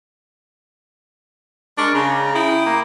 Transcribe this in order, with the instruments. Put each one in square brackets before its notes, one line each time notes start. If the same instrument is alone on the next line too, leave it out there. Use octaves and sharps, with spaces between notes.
[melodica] G#3 A#4 C#6 [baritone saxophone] D4
[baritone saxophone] C#3 [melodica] A#5
[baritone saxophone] E4 [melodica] G5 D#6
[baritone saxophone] A#3